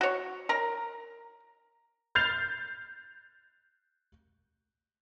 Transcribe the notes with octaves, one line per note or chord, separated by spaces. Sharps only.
F#4 C#5
A#4 A#5
F6 G6 A6 C7 F7